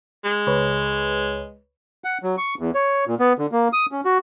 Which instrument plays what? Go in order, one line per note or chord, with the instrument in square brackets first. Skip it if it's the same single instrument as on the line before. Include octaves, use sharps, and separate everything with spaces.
[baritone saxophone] G#3
[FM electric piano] C#2 B4 C#5
[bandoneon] F#5
F#3
C#6
E2
C#5
A#2
B3
D3
A#3
D#6
C#4
F#4